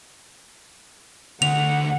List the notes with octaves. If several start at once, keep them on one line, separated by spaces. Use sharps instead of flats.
D2 D3 F#5 F7